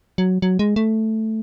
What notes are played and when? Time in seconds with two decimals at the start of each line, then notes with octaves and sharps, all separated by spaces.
0.18 F#3
0.42 F#3
0.59 G#3
0.76 A3